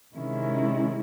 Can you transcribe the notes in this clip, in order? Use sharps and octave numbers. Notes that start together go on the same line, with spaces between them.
C3 D#3 G#3 C#4 E4